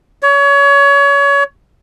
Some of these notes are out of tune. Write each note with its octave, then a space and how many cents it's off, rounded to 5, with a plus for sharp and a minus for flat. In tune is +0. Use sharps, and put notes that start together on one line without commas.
C#5 +30